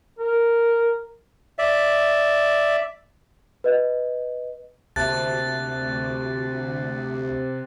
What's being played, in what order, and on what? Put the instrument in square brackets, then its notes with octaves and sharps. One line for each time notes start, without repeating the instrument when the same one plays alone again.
[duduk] A#4
[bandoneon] D5 E5
[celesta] B4 D#5
[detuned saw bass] D2 [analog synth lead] C3 [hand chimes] A#3 E5 A5 [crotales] F#6 A6